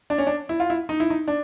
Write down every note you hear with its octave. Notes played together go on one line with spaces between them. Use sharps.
D4
C#4
D4
E4
F4
E4
D#4
E4
D#4
D4